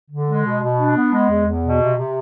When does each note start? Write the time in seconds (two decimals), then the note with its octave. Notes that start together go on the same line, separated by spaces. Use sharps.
0.11 D3
0.28 G#3
0.45 B2
0.62 B2
0.78 D4
0.96 B3
1.13 G#3
1.30 E2
1.46 E2
1.63 B2
1.81 C3
1.97 C3